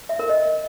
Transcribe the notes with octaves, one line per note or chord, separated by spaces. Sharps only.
E5
A#4
D#5